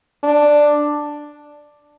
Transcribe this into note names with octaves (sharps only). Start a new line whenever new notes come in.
D4